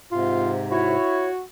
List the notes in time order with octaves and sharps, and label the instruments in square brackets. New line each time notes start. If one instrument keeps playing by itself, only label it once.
[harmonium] G#2 C3 [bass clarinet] F4
[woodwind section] E4 C#5 [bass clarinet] F#4